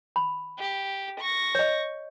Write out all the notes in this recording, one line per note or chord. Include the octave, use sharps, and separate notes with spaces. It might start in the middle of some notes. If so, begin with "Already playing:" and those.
B5
G4
C#6 A#6
C#5 D#5